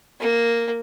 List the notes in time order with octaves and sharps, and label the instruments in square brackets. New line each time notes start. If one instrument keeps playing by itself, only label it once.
[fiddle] A#3